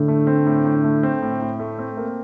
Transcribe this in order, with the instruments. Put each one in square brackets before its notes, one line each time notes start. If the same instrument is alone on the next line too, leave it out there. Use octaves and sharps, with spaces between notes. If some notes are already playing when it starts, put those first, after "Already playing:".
Already playing: [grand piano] A2 [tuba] D3
[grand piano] A3
C4
A2
A2
A3
C4
A2
A2
A3
C4
A#3